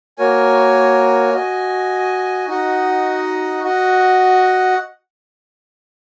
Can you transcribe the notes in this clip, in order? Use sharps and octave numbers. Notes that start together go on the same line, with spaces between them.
A#3 F#4 A#4 C#5 G#5
F#4 D#5 G#5
D#4 F#4 D#5 F#5
F#4 D#5 F#5